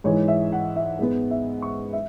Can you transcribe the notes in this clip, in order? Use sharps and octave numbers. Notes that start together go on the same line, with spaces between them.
G#2 E3 G#3 C#5
E5
F#5
E5
G#2 G#3 B3
E5
C#6
E5